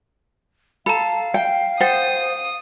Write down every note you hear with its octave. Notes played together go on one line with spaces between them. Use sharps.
A4 F5 A#5 B5
G5
C5 F#5 G5 D#6 A6